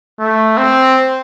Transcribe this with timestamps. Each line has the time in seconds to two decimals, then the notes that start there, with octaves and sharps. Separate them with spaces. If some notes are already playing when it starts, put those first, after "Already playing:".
0.20 A3
0.57 C4